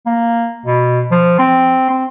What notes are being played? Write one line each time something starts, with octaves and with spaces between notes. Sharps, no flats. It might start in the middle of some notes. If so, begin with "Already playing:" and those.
A#3
B2
F3
C4
C4